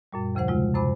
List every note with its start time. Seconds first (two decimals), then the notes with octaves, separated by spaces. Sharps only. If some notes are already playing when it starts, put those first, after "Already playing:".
0.12 F#2 A#2 G3
0.35 D#2 C#3 F3 C5 F#5
0.48 C3 G#3 F4
0.75 F#2 C3 C5 G#5 B5 D6